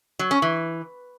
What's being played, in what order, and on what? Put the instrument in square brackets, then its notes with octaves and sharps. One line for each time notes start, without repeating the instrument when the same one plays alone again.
[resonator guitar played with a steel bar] F#3
C#4
E3